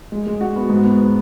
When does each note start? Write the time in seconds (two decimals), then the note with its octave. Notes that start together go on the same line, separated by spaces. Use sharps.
0.12 G#3
0.27 G#3
0.41 F#4
0.56 B3
0.70 G#2
0.85 B3